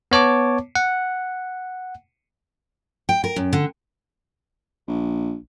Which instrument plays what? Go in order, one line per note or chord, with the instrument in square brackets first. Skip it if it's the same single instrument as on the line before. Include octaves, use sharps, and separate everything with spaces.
[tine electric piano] B3 C#5 A5 D6
F#5
[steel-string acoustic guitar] G5
A#4
F#2
D3
[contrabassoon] A#1